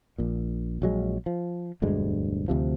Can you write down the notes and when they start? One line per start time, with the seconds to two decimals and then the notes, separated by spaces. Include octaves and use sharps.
0.18 A#1 A#2
0.82 A#1 F#3 G#3
1.26 F3
1.82 E1 D2 G2 G#3
2.48 D2 C3 F3